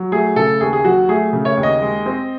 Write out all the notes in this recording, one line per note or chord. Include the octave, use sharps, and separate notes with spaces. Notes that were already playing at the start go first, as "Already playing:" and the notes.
Already playing: F#3
A3 G#4
C#3 A4
D#2 G#4
G#4
F#3 F#4
A3 G#4
C#3
C#5
D#2
D#5
G#3
C4